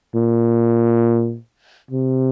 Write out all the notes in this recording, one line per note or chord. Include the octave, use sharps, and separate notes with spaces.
A#2
C3